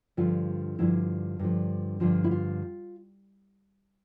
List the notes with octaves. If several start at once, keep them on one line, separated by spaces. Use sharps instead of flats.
G2 D3 F3 F4
G2 D3 F3 E4
G2 D3 F3
G2 D3 F3 F4
E4
F4